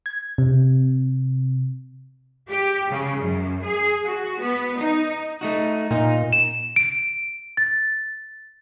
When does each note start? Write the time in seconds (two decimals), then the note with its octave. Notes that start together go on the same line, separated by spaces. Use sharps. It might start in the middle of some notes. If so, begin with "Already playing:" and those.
0.06 G#6
0.38 C3
2.49 G4
2.90 C#3
3.20 F#2
3.64 G#4
4.06 F#4
4.40 B3
4.79 D#4
5.41 A3 D#4 F#4
5.91 A#2 D#4
6.33 E7
6.76 D7
7.57 A6